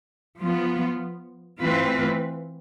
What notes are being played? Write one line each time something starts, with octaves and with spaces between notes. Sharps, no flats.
F3 B3 F4
E3 A3 C4 F4 B4